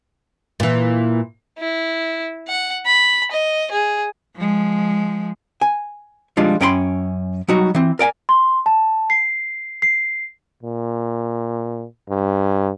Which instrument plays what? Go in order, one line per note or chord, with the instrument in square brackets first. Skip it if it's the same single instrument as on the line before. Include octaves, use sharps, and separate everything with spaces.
[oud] A#2 E3
[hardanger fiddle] E4
F#5
B5
D#5
G#4
[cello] F3 G#3
[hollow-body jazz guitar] G#5
F3 G3 G#3 D4 F4
F#2 C#4 G5 B5 C6
F#3 G3 D#4 F#4
E3 C4
A#4 D5 G5 G#5
[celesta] C6
A5
C7
C7
[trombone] A#2
G2